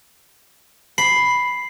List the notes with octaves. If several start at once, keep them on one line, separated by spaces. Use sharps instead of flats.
B5 C7